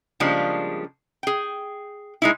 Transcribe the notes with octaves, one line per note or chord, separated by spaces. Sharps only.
C#3 F3 G3 G#3 A#3 D4
G#4 G5
G#3 D#4 E4